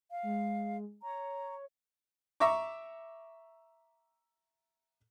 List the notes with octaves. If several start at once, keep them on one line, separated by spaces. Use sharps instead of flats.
F5
G#3
C#5 A#5
E5 A#5 C#6 D6